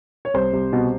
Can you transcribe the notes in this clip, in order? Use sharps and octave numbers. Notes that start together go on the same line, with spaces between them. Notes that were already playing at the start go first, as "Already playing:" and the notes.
C#5
C2 C5
C2
B2